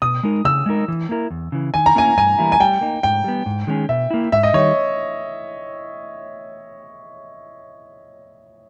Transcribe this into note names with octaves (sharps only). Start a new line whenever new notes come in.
B2 D#6
G#3 D#4 A#4
C#3 E6
G#3 D#4 A#4
E3
A#3 E4 A#4
E2
C#3 E3
D#3 G#5
A#5
A#3 C#4 E4 G#5
G2 G#5
E3 G3 A#3 E4
G#5
G3 G5
A#3 D#4
G#2 G5
G3 B3
G#2
D#3 G#3 C#4 G#4
B2 E5
A#3 E4
G#2 E5
D#5
D#3 G3 C#5